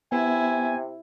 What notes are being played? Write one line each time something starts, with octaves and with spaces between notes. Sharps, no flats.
C3 B3 E4 G#5